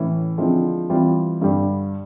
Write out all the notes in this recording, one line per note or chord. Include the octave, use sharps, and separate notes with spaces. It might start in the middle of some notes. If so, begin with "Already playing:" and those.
Already playing: A2 E3 A3 C#4 E4
D3 F3 G#3 C4 E4
E3 G3 C4 F4
G2 D3 G3